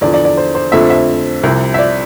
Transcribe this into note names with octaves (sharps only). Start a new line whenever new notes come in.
E2 D3 F3 D5
D5
D5
C5
C5
F2 D3 F3 A3 C4 E5
E5
C2 C3 F3
E5
D5